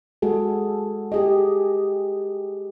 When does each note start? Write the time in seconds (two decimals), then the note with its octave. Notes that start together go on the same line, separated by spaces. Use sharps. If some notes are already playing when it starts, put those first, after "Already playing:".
0.22 G#3 F#4 G#4 A4
1.12 G4 G#4 D#5